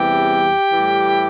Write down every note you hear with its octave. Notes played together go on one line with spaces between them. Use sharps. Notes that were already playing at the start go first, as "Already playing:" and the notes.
Already playing: E2 C3 E3 G3 G4
A2 E3 G3